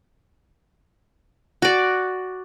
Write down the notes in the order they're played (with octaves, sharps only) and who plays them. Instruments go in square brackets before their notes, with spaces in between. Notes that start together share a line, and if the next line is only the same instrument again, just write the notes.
[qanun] F#4 D5